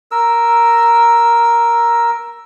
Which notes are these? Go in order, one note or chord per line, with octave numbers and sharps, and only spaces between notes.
A#4 E6